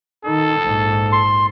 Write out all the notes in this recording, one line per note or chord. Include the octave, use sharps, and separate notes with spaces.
D#3 D#4 A4
A#1 G#2
C6